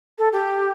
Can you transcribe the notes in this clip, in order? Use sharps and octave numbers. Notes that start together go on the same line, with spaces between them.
A4
G4